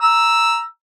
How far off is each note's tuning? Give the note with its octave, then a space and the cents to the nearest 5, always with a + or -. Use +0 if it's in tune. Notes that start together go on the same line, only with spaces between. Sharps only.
A#5 +0 E6 +0